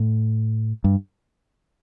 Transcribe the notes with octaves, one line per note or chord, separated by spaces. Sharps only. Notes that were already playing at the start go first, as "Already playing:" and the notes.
Already playing: A2
G2